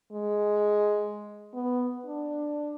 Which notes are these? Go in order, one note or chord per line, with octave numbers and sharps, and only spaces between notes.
G#3
B3
D4